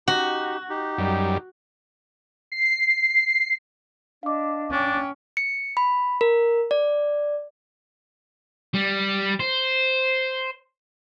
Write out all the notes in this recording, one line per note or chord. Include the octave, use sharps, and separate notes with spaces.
D#4 F#4 G4
D#4 G4
F#2 G3
C7
D4 D#5 F5 D6
C#4 D4 G5
C#7
B5
A#4
D5
G3
C5